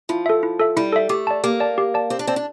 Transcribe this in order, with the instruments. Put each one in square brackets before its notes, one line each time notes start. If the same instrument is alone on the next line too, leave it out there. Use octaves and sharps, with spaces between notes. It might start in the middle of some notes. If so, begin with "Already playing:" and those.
[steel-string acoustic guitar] F3 [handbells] E4
[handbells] A4 E5
E4
A4 E5
[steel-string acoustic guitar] G3 [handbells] E4
[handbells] A4 E5
[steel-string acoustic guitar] A3 [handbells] G4
[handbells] D5 A5
[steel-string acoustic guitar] A#3 [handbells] G4
[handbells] D5 A5
G4
D5 A5
[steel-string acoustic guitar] C4 [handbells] G4
[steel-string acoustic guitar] D4
[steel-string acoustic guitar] C4 [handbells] D5 A5
[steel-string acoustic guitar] D4